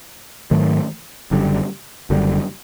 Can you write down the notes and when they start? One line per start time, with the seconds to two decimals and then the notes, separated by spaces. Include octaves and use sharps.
0.51 G#2 D#3 F#3 A3
1.31 F#1 F#2 D3 G3
2.10 F#1 F#2 D3 G3